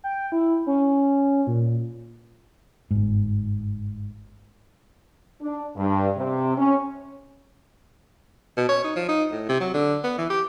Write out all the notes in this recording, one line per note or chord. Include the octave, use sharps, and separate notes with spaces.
G5
E4
C#4
A#2
G1 G#2
D4
G2
C3
C#4
B2
C#5
D#4
F3
D#4
A2
C3
F#3
D3
B3
E3
G4